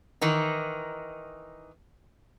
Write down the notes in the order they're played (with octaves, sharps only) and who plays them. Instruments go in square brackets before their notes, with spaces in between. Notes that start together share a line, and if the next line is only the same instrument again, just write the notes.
[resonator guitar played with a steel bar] D#3 E3 D#4